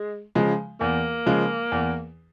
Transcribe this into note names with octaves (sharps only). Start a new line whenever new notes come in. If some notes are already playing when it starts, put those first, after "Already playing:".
Already playing: G#3
C#3 F3 G#3
E2 A#3
C#3 F3 G#3
E2